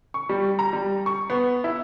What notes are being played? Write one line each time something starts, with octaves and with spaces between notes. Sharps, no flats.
C#6
G3
A#5
G3
C#6
B3
E4